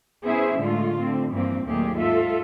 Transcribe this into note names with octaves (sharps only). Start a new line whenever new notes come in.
B3 C#4 E4 G#4 C5 E5
A2 D3 G#3 A3 F4
D3 A3 C4
G2 E3 F3 A#3 C4
D#2 A#2 F#3 A3 G4 G#4
G#2 F4 A4 E5